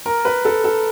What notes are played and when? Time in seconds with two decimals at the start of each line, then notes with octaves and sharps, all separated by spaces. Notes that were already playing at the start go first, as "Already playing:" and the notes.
0.06 A#4
0.25 B4
0.45 A4
0.64 A4